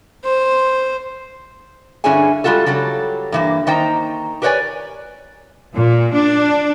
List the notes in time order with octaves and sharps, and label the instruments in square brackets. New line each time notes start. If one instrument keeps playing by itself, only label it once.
[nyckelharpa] C5
[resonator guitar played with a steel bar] G2 D3 C#4 E4 G#4 G#5
G3 G#3 F4 F#4 A4
C#3 F#3 G3 A4
G2 E3 A#3
D#3 A#3 D#4 C5 G5 A#5
G4 A#4 B4 C#5 D5 G#5
[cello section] A#2
D4